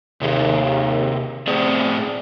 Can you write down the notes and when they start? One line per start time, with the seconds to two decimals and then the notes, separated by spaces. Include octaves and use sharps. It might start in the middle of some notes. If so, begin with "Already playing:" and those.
0.21 D#2 C3 G#4
1.47 A2 C4 G#4 D5